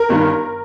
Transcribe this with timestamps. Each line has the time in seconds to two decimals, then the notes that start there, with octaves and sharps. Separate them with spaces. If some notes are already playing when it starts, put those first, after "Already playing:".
Already playing: A#4
0.09 G1 G2 D#3